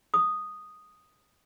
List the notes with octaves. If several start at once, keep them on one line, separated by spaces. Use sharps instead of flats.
D#6